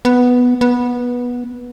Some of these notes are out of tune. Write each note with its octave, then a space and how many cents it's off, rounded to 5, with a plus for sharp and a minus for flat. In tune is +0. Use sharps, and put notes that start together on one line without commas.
B3 +0
B3 -15